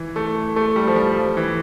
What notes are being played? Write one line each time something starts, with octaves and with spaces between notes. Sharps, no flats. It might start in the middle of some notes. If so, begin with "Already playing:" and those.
Already playing: E3
A3
A3
G3
F3
G3
F3
E3